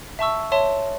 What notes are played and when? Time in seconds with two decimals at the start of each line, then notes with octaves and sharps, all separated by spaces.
0.19 E5 A5 C#6 E6
0.52 C#5 E5 A5 C6